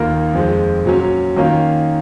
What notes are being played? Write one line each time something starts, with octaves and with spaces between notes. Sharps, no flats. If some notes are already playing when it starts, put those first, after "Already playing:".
Already playing: D#2 D#3 A#3 F4 A#4
F2 F3 G#3
A#2 F#3 C#4
D#3 A#3 C#4 F4